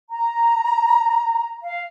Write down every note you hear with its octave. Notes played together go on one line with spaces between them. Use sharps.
A#5
F5